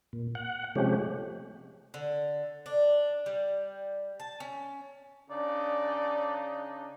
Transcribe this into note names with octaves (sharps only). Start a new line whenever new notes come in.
A#2
F#5
C3 F3 G#3 A3 C#4 G4
D3
D4
G3
A5
C#4
C#3 D4 D#4 D5